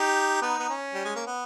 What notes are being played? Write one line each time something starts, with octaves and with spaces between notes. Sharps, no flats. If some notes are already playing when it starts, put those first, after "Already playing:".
Already playing: D#4 G4
B3 D#4
B3
C#4
G3
G#3
A#3
B3